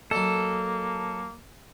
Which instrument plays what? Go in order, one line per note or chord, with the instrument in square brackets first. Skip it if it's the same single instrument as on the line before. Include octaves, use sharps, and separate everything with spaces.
[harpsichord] F#3 D#5 [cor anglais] A#3 [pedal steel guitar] A4